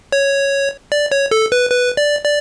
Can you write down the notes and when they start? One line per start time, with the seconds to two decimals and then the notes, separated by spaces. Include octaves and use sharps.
0.12 C#5
0.92 D5
1.11 C#5
1.31 A4
1.52 B4
1.71 B4
1.97 D5
2.24 D5